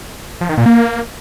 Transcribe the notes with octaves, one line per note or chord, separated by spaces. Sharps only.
F3
D#3
A#2
A#3